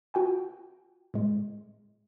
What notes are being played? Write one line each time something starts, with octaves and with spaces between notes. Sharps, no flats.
F4 F#4 G5 G#5
A2 G#3